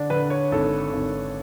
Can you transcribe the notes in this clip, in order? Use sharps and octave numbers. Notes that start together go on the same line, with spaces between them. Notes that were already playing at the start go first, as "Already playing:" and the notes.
Already playing: D3 D4
D3 B4
C#5
G#1 A4
G#1